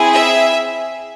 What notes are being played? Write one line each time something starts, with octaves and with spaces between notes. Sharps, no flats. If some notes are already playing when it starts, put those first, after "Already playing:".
Already playing: C4 E4 G#4
E5